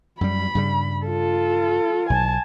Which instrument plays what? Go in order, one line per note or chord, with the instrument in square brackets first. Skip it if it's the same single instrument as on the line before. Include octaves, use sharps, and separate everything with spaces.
[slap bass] F#2 G3 [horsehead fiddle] B5
[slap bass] G2 C#3 G3
[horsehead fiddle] F4 A4
[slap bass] B1 [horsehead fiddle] G#5 A5